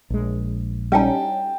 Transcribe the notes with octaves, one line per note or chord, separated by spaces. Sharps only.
A#1 G#3
G3 C#4 D#4 G5 A5